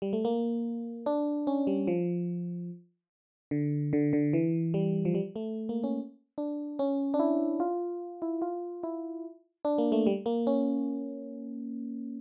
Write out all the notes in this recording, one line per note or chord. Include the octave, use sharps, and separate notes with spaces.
G3
A3
A#3
D4
C#4
G3
F3
D3
D3
D3
E3
G3
F3
G3
A3
A#3
C#4
D4
C#4
D4
E4
F4
E4
F4
E4
D4
A#3
A3
G3
A#3
C#4